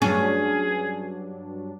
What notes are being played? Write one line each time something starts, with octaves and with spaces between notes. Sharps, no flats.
G2 F#3 C#4 D4 G#4